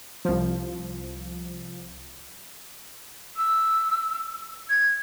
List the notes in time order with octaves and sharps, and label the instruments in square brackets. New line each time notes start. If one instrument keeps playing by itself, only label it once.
[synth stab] C2 F3
[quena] E6
G#6